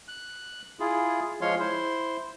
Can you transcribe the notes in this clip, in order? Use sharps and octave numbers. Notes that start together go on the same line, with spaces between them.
F#6
E4 F4 G#4
F3 G#3 C#5 F5 C6
E4 C5 C6